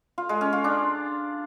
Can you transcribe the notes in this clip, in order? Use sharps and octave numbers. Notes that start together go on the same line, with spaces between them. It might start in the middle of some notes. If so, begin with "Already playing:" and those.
F4
G#3
C#4
F4
D4